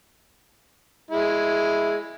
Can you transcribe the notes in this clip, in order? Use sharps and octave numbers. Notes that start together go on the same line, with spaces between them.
G#3 E4